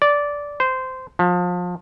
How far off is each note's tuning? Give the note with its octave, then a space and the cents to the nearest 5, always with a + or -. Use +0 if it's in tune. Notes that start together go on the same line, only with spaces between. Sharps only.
D5 -10
C5 -15
F3 +30